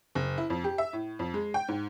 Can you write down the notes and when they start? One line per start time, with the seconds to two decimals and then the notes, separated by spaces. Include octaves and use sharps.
0.15 F#1
0.38 E4
0.50 F2
0.64 G4
0.78 E5
0.93 A2
1.19 F2
1.34 G#3
1.54 G5
1.68 G#2